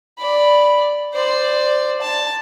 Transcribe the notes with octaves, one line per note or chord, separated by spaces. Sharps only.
D5 B5
C5 D5
A5